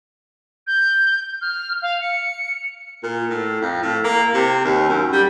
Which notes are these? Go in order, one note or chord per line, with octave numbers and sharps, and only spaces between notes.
G6
F6
F5
C#7
A#2
A2
F2
A2
A#3
C3
D#2
F#2
G3